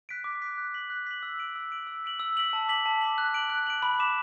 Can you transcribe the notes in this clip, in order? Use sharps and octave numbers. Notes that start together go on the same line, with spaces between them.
F#6 B6 D7
D6
F#6 B6 D7
F#6
B6 F#7
F#6
B6 F#7
E6
D7 F#7
E6
D7 F#7
E6
B6 D7 F#7
E6
B6 D7 F#7
A5
D6 B6 F#7
A5
D6 B6 F#7
F#6
D7 F#7
F#6
D7 F#7
B5
D6 B6 E7